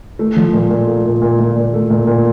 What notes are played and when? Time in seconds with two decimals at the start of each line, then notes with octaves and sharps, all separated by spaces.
0.19 A3
0.36 F3
0.53 A#2
0.70 A#2
0.87 A3
1.05 A#2
1.22 A#2
1.39 A#2
1.56 A#2
1.74 A3
1.90 A#2
2.07 A#2